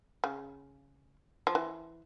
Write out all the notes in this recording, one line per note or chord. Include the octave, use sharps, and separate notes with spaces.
C#3
F3
E3